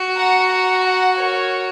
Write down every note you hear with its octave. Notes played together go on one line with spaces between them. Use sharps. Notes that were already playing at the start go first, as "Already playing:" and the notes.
Already playing: F#4
F#5 A#5
F#5 A#5
F#5 A#5
A#4 C#5